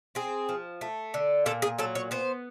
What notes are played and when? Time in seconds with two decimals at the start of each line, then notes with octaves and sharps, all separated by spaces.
0.15 C4 G#4
0.49 F3
0.81 A3
1.14 D3
1.46 A#2 A4
1.62 G#4
1.78 F#3 A4
1.95 C#5
2.11 B3 C5